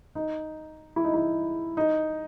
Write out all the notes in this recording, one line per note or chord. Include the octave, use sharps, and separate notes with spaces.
D#4
E4
D#4
E4
D#4